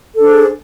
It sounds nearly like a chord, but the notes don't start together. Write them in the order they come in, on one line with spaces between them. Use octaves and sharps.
A4 D4 C5 G#4